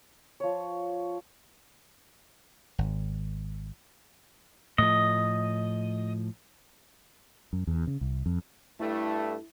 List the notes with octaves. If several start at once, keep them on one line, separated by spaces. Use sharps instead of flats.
F3 C#5
G#1
A2 F3 D#5
F#2
E2
C#3
C2
F2
G2 A3 E4